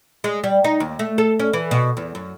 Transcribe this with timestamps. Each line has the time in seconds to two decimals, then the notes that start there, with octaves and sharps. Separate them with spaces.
0.24 G#3
0.44 G3
0.64 D#4
0.80 D#2
0.99 A3
1.18 A4
1.39 C#4
1.53 E3
1.71 B2
1.97 E2
2.15 F#2